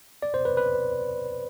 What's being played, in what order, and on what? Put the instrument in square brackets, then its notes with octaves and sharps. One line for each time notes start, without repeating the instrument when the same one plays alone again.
[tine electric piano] D5
C5
B4
B4